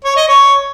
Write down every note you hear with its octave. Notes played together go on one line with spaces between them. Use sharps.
C#5
D#5
C#5